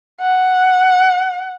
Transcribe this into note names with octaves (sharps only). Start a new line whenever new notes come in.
F#5